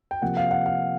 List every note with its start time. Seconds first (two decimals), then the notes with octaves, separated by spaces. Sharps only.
0.11 G5
0.22 C3 F3 A#3 F#5
0.37 F5
0.51 F#5
0.66 F5